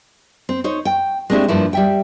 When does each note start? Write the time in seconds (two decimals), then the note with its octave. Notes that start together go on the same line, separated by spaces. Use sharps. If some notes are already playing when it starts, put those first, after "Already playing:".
0.49 C4
0.64 D#4 C5 C#5
0.85 G5
1.30 G#3 A3 C4 D4 E4 G4
1.48 G2 F3 A#3 E4
1.73 G3 E5 G5